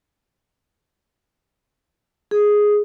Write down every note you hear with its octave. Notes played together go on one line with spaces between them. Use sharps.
G#4